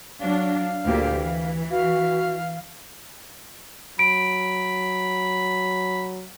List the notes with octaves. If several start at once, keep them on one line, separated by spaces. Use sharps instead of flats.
F#3 D4 F5
D2 A#2 G4
E3
F#4 F5
F#3 B5 D7